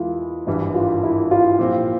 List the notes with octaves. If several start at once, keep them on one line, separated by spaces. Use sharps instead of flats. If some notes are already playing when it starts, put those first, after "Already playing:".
Already playing: E2 E3 G#3 E4 F4
G#1 G2 E3 G3 E4
F4
E4
F4
A#2 F3 C4 G4